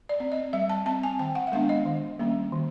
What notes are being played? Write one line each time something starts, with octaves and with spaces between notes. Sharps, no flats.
D5
C4
D#5
G3 E5
A5
C4 A5
G#5
D#3 G5
F#5
E5
G#3 B3 D4 F5
D#5
D#3
G3 A#3 C#4
D#3